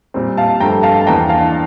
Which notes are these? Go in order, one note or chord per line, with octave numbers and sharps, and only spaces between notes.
A#2 G3 C4
F5 A5
G2 F3 A3 G5 A#5
F5 A5
A5
E2 E3 A#3 D4 G5 A#5
F5 A5